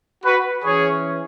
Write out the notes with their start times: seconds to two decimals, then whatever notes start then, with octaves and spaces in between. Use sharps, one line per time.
0.24 F#4 B4
0.65 E3 C#4 G#4 C#5